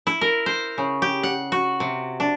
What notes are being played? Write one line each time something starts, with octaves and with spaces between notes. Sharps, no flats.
E4
A#4
C5
C#3
G4
F#5
F#4
C3
D4